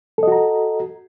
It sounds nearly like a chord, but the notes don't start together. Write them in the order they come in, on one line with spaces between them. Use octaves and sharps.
A4 D#5 F#4 A#5